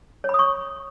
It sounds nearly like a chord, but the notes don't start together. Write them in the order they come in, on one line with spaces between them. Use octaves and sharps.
C#5 B5 D#6 C#6